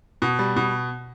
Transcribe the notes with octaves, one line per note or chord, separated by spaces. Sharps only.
B2
G3
B2